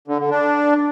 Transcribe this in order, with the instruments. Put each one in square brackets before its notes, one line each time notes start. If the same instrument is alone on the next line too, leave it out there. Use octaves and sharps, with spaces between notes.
[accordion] D3
D3
D4